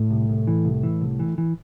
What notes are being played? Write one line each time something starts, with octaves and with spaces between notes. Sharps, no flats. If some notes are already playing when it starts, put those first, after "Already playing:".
Already playing: A2
C2
C2
E3
C2
E3
C2
E3
E3